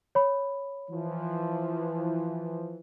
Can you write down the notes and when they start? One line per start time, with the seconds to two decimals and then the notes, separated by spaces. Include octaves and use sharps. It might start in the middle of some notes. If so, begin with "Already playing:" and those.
0.15 C#5 B5
0.91 E3 F3